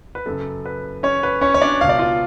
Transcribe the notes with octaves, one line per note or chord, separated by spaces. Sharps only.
B4
F#2 C#3 A4
B4
C#4 C#5
B4
C#4 C#5
C#5
D4 D5
C#2 B2 F5
D5
F4 F5